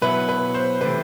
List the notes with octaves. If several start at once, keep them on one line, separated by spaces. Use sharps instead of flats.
B2 F#3 B3 E4 B4
B4
C5
C3 E3 A3 C4 B4